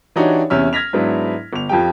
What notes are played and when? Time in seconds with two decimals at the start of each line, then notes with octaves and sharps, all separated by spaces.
0.16 E3 D4 D#4 F#4 G4 C#5
0.50 E2 C3 C#4 E5 F6
0.73 F6 G#6 A#6 B6 F7
0.93 G#2 F#3 B3 D4 E4
1.53 G1 F7
1.69 F2 F3 G4 G5